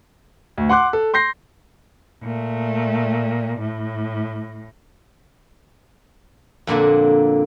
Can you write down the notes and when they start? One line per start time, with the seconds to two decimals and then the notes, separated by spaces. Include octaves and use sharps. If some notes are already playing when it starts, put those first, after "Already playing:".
0.58 D2
0.69 F#5 C6 D6 F#6
0.93 A4
1.14 C6 G6 A#6 C7
2.22 A#2 A3
3.60 A2
6.67 F2 A#2 D3 A#3